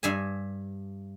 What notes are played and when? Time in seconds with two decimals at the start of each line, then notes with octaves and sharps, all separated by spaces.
0.03 G2 E5 G#5